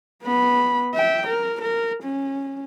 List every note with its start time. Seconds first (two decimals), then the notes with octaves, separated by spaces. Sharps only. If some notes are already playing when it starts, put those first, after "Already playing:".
0.24 B3 B5
0.94 E5 G5
1.27 A#4
1.62 A#4
2.03 C#4